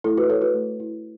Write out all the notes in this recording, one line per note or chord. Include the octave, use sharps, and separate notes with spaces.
A3 E4 A4
F#4 B4
E4 A4 C#5
F#4 B4
A3
E4